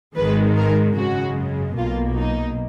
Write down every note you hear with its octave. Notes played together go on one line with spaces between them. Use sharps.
G#1 G#2 D#3 G#3 B4
A#4
F#2 C#3 G#3 F#4
B1 B2 A#3 F4
D#4